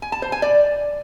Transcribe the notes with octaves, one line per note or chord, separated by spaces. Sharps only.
G#5
A5
C5
G#5
D5